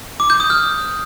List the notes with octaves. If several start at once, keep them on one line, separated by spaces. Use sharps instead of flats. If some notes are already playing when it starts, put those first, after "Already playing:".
D6
G6
D#6
F6